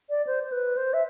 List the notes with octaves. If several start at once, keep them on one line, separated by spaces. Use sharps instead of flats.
D5
C5
C5
B4
C5
E5